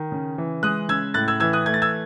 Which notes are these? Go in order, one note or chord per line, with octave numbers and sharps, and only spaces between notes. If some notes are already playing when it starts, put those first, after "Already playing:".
Already playing: D#3
C#3
E3
G#3 D#6 F#6
C#3 E6 G#6
A2 F#6 A6
E6 G#6
E3 E6 G#6
D#6 F#6
A3 G#6
A6
E6 G#6